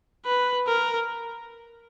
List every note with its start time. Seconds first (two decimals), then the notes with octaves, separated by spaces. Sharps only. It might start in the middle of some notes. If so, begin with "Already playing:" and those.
0.26 B4
0.67 A#4